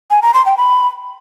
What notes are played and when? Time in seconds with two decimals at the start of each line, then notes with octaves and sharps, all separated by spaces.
0.11 G#5
0.22 A#5
0.34 C6
0.46 G5
0.57 B5